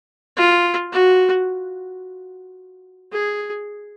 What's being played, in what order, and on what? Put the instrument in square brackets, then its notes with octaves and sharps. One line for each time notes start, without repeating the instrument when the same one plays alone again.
[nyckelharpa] F4
F#4
G#4